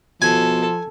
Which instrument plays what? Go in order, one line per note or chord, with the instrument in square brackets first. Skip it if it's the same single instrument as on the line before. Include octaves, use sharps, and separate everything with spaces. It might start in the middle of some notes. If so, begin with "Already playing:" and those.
[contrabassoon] B2 [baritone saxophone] F3 [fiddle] A4 [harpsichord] G#5